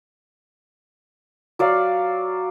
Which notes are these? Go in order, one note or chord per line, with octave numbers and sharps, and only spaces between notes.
F#3 D5 F5